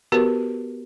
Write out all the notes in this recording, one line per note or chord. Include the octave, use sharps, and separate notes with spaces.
B3 F#4 G4 A#4 B4